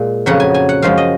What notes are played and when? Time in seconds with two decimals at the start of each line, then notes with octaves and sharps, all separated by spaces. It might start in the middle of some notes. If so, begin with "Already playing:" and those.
Already playing: A#2 G#3
0.26 F2 C#3 F#3 F#5
0.40 G#5
0.54 G#5
0.69 F#5
0.82 F#2 F3 G#3 F5
0.98 D#5